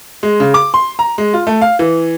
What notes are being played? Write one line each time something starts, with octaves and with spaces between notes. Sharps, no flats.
G#3
C#3
D6
C6
A#5
G#3
F4
A3
F5
E3